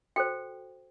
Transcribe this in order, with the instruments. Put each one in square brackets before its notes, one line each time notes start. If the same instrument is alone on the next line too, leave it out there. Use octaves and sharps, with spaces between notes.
[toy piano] F#4 A4 C5 G5